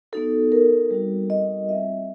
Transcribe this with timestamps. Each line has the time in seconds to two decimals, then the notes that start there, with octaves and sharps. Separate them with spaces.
0.13 B3 D#4 F#4 A4
0.52 A#4
0.91 G3 C4 D#4 F#4
1.30 D#5
1.69 G3 C4 F4 E5